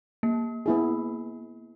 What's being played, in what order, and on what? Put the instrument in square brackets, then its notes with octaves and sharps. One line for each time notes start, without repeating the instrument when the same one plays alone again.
[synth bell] A#3
[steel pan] B3 E4 G#4